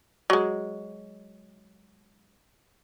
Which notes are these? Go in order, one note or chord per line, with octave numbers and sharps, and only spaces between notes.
F#3 G#3